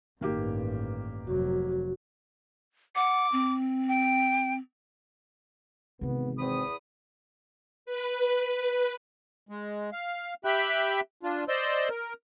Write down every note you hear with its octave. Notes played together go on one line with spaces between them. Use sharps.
A1 G2 D#3 A#3 G4
F1 F#3 F#4
F#5 D6
C4
G5
G#1 C3 E3 B3
E2 C4 B5 D#6
B4
G#3
F5
G4 E5 G5 B5 F#6
D4 F4
C5 D5 D#5 C6 E6
A#4